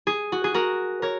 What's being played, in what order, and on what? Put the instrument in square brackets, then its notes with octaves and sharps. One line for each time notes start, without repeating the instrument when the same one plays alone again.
[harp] G#4
F#4
G#4
F#4 A#4
A#4 C#5